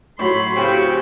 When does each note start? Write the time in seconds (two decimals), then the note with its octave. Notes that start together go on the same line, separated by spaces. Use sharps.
0.19 A2 F#3 B5 C6
0.56 C#3 C4 G4